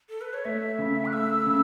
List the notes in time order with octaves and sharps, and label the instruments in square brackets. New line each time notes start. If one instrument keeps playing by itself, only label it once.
[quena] A4
B4
C#5
[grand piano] A3 [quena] E5
[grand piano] C#3
[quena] F#6
[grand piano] A3 [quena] E6
[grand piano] C#3